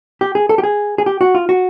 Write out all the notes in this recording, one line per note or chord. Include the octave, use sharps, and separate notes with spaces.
G4
G#4
A4
G4
G#4
G#4
G4
F#4
F4
F#4